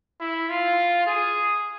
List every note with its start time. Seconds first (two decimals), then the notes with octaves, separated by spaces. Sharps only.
0.20 E4
0.49 F4
1.06 G#4